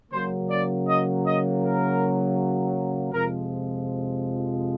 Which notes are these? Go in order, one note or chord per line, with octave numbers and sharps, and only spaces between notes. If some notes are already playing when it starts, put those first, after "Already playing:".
C#3 F#3 A#3 C5
D5
D#5
D#5
A#4
F2 C3 F3 G#3 A#4